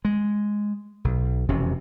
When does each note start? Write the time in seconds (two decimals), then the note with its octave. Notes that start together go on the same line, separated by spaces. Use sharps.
0.05 G#3
1.04 B1
1.49 E1 F2 C3 C#4